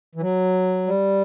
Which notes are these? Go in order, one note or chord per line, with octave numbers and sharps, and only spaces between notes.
E3
F#3
G3